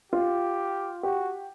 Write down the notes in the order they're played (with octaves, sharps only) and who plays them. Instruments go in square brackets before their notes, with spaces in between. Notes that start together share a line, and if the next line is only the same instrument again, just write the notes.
[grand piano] F4 [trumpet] G4
[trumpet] F#4 [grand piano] G4